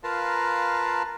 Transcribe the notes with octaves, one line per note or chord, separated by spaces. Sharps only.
F4 A#4 B4 F5 A5 A#5